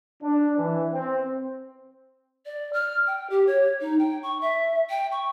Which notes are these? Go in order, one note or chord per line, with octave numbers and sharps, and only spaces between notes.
D4
E3
C4
D5
F6
G5
G4
C#5
D#4
G5
C#6
E5
G5
C#6